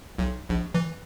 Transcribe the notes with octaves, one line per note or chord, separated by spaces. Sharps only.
B1
A#1
E3